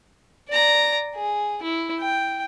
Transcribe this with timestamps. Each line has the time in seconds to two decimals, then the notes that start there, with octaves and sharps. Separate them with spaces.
0.49 D5 A#5
1.15 G#4
1.62 E4
2.00 G5